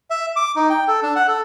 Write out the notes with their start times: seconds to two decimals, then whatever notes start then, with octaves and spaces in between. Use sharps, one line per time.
0.10 E5
0.36 D6
0.56 D#4
0.70 G5
0.88 A4
1.03 D4
1.16 F#5
1.28 A4